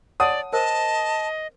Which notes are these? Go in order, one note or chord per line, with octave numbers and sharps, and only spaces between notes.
C#5 D5 F#5 A5 D#6
A#4 C5 D#5 A5